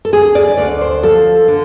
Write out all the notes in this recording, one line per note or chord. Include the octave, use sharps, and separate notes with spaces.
A4
D2 G#4
D5
D2 D5
C5
F3 A4
D3